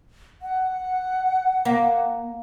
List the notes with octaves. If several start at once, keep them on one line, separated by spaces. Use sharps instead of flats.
F#5
A#3